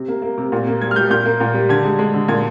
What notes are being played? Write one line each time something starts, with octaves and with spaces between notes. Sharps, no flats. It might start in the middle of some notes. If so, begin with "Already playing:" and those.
Already playing: C3
A#3
A#3
C3
A#2
A#3
G3 G#6
F6
G3 G6
A#2 G6
A#3
A#2
G3
D3 G#6
G#3
G#3
D3
A#2 G#6